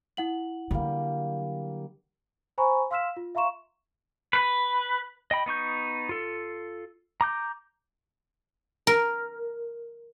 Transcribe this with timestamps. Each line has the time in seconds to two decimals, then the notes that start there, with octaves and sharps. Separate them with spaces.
0.17 E4 F#5 F#7
0.71 D3 F#3 G3 A#3
2.58 C5 G#5 A#5 B5 C#6
2.91 F5 C6 E6 F6 B6 E7
3.17 F4
3.35 E5 F5 A#5 C6 C#6 E7
4.33 B4
5.31 D#5 G5 B5
5.46 B3 D#4 C#6 G6
6.09 F4 A4
7.21 A#5 D6 G6
8.87 A#4